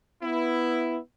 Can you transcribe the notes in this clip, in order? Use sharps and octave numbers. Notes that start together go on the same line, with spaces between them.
B3 E4